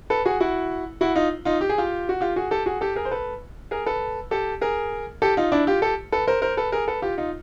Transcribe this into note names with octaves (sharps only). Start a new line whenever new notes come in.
A4 B4
F#4 G#4
E4 F#4
E4 F#4
D#4 F4
D#4 F4
G4
G#4
F4 G4
F#4
F4 G4
F#4 G#4
G4 A4
F#4 G#4
G4 A4
G#4 A#4
C5
A4 B4
G#4 A#4
A4 B4
G4 A4
G#4 A#4
G4 A4
D#4 F4
D4 E4
F4 G4
G4 A4
A4 B4
A#4 C5
A#4 C5
A4 B4
G#4 A#4
A4 B4
F4 G4
D#4 F4